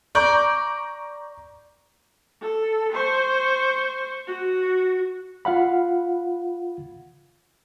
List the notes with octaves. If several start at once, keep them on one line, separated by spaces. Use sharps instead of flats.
D5 A#5 C#6 G6
A4
C5 C#6
F#4
F4 F5 F#5 B5